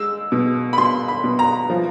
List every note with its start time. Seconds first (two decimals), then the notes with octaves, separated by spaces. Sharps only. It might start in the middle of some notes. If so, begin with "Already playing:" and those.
Already playing: G#3 E6
0.32 B2
0.73 B5
0.78 B2 C6
1.08 B5
1.24 B2
1.39 A#5
1.70 F3